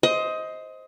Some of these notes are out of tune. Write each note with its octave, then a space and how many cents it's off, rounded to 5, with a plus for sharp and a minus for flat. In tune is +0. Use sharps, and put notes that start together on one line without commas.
C5 +0 D#5 +20